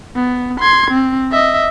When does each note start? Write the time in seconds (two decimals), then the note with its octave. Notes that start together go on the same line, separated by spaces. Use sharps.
0.16 B3
0.60 C6 G#6
0.90 C4
1.32 D#5 E5